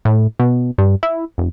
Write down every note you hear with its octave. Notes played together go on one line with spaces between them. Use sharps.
A2
B2
G2
E4
F1